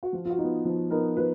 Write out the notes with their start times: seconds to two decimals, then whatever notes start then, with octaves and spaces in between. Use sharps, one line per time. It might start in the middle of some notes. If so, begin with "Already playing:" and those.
0.03 F#4
0.12 F3 F4
0.25 F4
0.30 F#4
0.38 D#4
0.43 B3
0.65 F3
0.90 B3 D#4 A#4
1.17 F3 B4